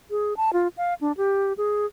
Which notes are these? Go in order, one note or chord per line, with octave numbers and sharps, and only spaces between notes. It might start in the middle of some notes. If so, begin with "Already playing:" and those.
G#4
A5
F4
F5
D4
G4
G#4